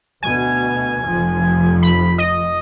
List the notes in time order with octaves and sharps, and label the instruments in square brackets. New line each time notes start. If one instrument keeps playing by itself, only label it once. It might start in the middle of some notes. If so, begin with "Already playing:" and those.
[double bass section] D2 B2 [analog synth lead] G#5
[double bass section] F1 F2 F3
[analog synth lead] B5
D#5